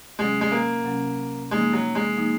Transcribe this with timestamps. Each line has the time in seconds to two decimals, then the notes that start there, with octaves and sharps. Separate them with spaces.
0.19 C3 F#3 G#3 C#4
0.41 G#3
0.52 A#3
0.85 C3 F#3 C#4
1.51 F3 G#3 A#3 D#4
1.73 F#3
1.95 G#3
2.17 F3 A#3 D#4